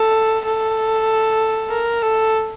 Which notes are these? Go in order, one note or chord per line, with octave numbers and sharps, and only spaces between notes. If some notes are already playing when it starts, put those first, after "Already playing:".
Already playing: A4
A4
A#4
A4